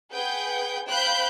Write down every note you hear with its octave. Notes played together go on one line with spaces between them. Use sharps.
G#4 B4 F#5 G5 G6
C5 F5 G5 B5 F#6 G6